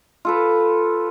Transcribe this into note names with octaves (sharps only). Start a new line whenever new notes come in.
F4 A4 B4